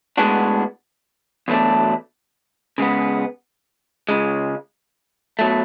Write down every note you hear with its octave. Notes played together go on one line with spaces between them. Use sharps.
A2 G#3 B3 D4 F#4
E2 B2 F#3 A3 D4
C#3 G#3 B3
C#2 C#3 G#3
B2 F#3 A3